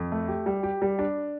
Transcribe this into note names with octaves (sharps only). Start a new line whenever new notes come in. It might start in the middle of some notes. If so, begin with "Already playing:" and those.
Already playing: F2
A3
G4
G3
G4
G3
D4